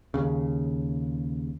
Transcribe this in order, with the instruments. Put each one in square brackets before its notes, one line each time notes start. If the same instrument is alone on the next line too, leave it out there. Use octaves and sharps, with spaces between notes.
[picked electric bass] D#2 C#3